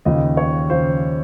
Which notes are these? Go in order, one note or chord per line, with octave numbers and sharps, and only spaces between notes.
D#2 C#3 F3 D#5
C#5
C#3 F3 C5